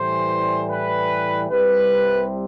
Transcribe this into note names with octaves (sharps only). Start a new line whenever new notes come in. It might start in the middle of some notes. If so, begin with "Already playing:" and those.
Already playing: A2 E3 G3 C5
B4
C2 C3 G3 B4